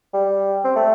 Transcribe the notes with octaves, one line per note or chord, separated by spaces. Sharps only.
G3
C4
A3